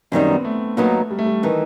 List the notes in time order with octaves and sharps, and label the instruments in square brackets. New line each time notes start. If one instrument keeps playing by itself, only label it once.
[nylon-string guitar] F#2 D#3 G3 D#4 [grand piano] C4
[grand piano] B3
A3
[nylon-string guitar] D#2 D#3 F#3 B3 D#4
[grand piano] G3
A3
G3
[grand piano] D#3 [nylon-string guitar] E3 A3 D#4